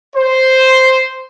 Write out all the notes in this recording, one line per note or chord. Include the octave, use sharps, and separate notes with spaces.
C5